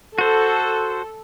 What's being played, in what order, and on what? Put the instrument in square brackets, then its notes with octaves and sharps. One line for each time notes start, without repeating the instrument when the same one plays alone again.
[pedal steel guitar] F#4 C5 [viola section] A4